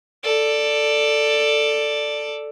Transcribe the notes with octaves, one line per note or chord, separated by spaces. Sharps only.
A4 D5